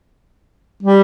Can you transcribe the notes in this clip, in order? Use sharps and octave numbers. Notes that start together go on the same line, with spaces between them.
G3